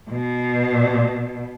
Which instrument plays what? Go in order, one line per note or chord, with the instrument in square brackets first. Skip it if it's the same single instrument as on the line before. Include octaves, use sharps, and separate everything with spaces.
[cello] B2